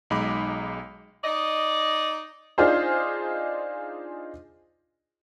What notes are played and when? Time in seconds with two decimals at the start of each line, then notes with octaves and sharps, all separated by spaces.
0.10 B1 G#3 D#4 B5 D6
1.24 D#4 D5 D#5
2.58 D4 D#4 F4 G#4 C5